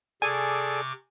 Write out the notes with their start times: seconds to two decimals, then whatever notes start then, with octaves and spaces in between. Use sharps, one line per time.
0.22 C3 G#4 A4 D5 G#5 C#6 D6